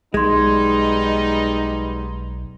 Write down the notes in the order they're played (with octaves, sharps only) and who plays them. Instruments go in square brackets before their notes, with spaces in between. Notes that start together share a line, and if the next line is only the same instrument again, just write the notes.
[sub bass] B1 [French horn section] G3 B3 D#4 [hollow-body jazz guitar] G#3 [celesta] C6 G#6